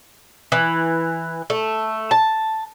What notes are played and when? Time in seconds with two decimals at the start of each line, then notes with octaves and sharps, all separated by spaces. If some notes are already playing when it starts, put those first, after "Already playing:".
0.52 E3
1.50 A3
2.11 A5